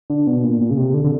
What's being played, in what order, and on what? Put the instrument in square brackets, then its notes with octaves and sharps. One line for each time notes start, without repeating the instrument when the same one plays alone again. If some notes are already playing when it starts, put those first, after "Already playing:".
[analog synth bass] D3
B2
A#2
A#2
C#3
C3
D3
D3